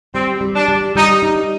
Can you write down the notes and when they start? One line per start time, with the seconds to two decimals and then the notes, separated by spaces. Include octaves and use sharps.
0.14 G3 C4
0.41 G3
0.55 D4
0.68 G3
0.96 G3 D#4
1.23 D#4